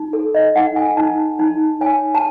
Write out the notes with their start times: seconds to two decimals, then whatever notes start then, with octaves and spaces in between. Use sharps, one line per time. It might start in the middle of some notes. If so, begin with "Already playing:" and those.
Already playing: D#4
0.13 A4
0.35 D#5
0.56 D#4 F#5
0.76 G#5
0.97 D#4 A5
1.39 D#4 A5
1.81 C#5 G#5
2.15 A5